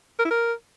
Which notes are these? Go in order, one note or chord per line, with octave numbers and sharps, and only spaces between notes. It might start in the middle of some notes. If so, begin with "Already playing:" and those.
A#4
E4
A#4